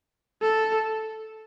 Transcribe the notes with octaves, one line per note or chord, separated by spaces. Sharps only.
A4